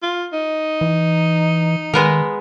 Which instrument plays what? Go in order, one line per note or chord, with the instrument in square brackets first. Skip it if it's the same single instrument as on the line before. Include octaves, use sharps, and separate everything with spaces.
[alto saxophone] F4
D#4
[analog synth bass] E3
[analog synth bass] D#3 [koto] G#3 B3 A#4